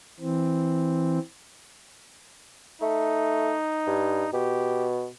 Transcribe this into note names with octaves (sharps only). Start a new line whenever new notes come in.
E3 C4
A3 D#4
G2
B2 G4